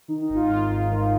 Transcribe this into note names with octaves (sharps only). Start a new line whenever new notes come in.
D#3 D#4
D#4
G#1
F4
G#2
G#1
D#3